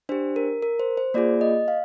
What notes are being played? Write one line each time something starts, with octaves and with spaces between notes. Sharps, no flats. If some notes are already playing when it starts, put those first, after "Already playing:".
D4 G4 C5
A#4
A#4
C5
C5
A#3 F4 G#4 D5
D#5
F5